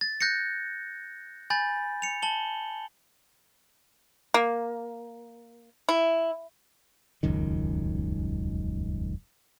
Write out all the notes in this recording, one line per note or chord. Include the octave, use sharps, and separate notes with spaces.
A6
F#6 G6 A#6 C#7
G#5 B5 G6 A6
C#7 F7
A5 F#7 G7
A#3
E4
D#1 C#2 F#2 D#3